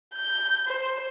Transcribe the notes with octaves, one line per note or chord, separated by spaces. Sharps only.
G6
C5